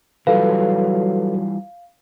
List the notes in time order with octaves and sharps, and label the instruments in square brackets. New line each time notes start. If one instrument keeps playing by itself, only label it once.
[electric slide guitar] E3 G3 F4 [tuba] F#3 [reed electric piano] A4 B4 [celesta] F5